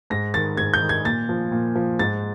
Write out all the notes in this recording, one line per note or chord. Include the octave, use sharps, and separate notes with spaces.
G#2 A#6
D#3 A6
G#2 G#6
G6
D#3
G#6
A#2 A6
F3
A#2
F3
G#2 A6